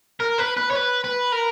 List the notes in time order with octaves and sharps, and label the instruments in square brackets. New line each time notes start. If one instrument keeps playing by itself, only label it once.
[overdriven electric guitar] A#4
B4
B4
C#5
B4
B4
A#4